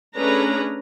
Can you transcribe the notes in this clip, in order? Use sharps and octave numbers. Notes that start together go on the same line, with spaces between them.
A3 C#4 D4 G#4 B4 A#5